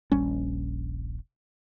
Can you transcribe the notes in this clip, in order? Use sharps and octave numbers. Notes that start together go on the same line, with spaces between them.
D#1 A#1 G3 C#4